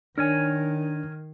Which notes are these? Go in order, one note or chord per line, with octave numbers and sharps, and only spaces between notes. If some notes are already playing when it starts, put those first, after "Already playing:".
D#3 D4 A#4 C#5 G#5